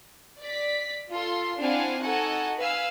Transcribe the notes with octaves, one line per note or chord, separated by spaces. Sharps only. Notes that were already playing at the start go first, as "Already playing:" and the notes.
D5 B6
F4 A4 C6
C4 D4 E4 F5 F#5 G#5
D#4 F#4 A4 F#5 G#5
B4 F5 G#5 E6